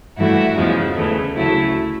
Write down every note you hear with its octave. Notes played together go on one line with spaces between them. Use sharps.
G2 E3 A3 E4 F#4
E2 C#3 F3 G#3
D2 C#3 E3 A3
D2 C#3 F#3 A3 E4